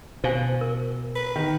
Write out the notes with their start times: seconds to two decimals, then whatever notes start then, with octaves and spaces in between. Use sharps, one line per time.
0.24 B2 C5 F5 G#5
0.61 A#4
1.15 B4
1.36 D#3